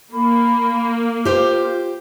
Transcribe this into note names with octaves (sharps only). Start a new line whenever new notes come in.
A#3 B5
F4 G4 C5